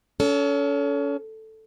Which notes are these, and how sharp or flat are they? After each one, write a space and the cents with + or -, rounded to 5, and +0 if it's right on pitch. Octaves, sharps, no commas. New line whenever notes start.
C#4 +30 A4 -5